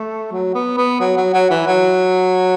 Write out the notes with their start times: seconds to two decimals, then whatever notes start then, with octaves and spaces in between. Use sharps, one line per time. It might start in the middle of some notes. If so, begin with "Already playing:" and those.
Already playing: A3
0.32 F#3
0.55 B3
0.77 B3
1.00 F#3
1.17 F#3
1.34 F#3
1.50 E3
1.67 F#3